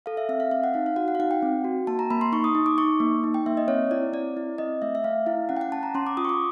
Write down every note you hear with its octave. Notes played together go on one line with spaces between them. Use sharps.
A4 F5
E5
C4 E5
F5
C4 F5
F#5
D#4 F5
F5
F#4 F#5
F#5
F5
D#4 F#5
G5
C4
F#4
A#3 A5
A#5
A#3 B5
C6
D#4 C#6
D#6
D#4
D6
D#4 C#6
A#3
D#4
G5
A#3 E5
D#5
C4 C#5
E4 D5
C4 D5
E4
C4 D#5
A3 E5
E5
A3 F5
E4 F5
C#4 F#5
G5
F#5
C#4 A5
A#5
C#4 C6
D6
F4 D#6
C#6
D6